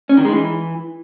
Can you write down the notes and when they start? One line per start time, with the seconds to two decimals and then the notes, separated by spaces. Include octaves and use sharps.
0.09 C#4
0.17 D#3
0.25 G#3
0.32 E3